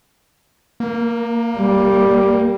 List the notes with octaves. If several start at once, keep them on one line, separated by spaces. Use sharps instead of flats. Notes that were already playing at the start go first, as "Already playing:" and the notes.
A#3
G3